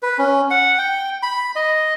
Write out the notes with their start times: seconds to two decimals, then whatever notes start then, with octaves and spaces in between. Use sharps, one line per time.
0.03 B4
0.18 C#4
0.51 F#5
0.78 G5
1.23 B5
1.56 D#5